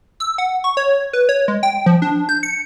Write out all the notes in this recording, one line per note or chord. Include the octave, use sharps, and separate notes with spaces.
E6
F#5
C#6
C#5
B4
C#5
G#3
G5
F3
D4
G6
C#7